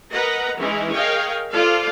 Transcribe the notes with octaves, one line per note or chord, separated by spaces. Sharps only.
A#4 B4 D#5 F#5 A#5
E3 G#3 C#4 D#4 E4
G#4 A#4 C#5 D#5 F5 G5
F4 A4 C5 D5 F5